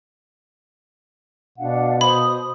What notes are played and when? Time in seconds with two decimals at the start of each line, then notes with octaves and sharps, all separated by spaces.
1.58 B2 D4 F5 F#5
2.01 C5 B5 D#6